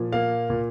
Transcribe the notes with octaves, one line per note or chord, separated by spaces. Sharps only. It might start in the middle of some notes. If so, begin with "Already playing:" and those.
Already playing: A#2 F3
A#3 F5
A#2